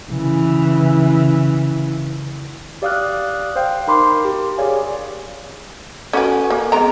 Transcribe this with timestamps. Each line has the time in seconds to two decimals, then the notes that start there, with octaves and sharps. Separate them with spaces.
0.11 C#3 E3
2.82 G4 D5 F5 D#6 F6 F#6
3.56 C5 F5 G5
3.87 D#4 A#4 B5 C6 D6
4.25 G4
4.57 G4 G#4 C#5 D5 F5 G#5
6.13 C#4 F#4 A4 B4 G#5
6.50 A#3
6.72 G#3 B3 C4 G#4 A#5